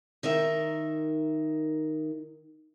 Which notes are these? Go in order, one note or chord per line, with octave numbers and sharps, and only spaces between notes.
D#3 D#4 A#4 E5